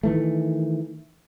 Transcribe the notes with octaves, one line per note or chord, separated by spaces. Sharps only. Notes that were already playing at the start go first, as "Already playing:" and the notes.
D#3 E3 A3